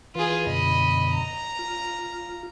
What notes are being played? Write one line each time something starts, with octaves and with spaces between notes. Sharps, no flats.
E3 F4 G#4 B4
F#2 B2 D3 D#5 B5
A#5
F4